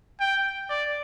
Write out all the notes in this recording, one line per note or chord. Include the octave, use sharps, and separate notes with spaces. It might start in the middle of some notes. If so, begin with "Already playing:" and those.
G5
D5